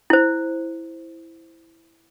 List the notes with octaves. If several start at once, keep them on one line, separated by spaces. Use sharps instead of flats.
E4 C5